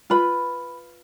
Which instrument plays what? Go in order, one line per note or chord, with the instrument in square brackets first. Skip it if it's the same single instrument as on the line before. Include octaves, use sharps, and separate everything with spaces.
[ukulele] F4 B4 B5